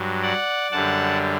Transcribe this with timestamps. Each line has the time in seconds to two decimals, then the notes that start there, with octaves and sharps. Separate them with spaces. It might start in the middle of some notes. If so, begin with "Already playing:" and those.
Already playing: G2 F#3
0.22 D5 F#5
0.72 F#2 D3 G3 F#5 A5